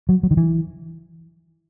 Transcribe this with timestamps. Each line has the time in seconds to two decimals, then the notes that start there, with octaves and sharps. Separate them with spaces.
0.09 F#3
0.23 F#3
0.31 D#3
0.37 E3